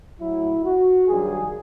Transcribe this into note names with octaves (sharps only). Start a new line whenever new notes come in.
A2 F#3 E4
F#4
G2 D#3 F#3 G#4